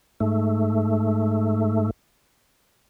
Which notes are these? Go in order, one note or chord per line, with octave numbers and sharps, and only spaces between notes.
G#2 A3